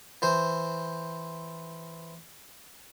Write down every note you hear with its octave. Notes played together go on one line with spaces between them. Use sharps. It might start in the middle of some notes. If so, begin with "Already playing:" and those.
E3 C5